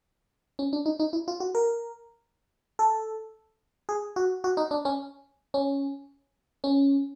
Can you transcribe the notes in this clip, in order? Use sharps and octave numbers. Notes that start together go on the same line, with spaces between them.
C#4
D4
D#4
D#4
E4
F4
F#4
A#4
A4
G#4
F#4
F#4
D#4
D4
C#4
C#4
C#4